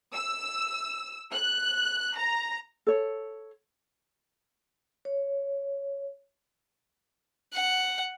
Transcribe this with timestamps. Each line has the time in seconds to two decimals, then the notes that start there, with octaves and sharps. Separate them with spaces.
0.15 E6
1.33 F#6
2.18 A#5
2.87 A4 C#5
5.05 C#5
7.53 F#5